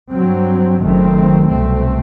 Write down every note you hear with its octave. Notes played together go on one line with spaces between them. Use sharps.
G2 F#3 C4
F#1 F#2 D#3 A3 C4
C2 B2 A3 C4